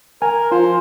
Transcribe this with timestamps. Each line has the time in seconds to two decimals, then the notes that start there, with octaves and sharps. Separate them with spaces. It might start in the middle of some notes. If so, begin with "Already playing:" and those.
0.22 A#4 G#5
0.52 F3 C5